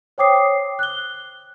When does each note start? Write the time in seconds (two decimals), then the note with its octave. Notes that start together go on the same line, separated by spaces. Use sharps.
0.18 C5 C#5 G5 D6 D#6 C7
0.79 F#6 G7